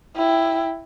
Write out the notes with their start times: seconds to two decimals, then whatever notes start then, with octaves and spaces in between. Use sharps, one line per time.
0.16 E4 G5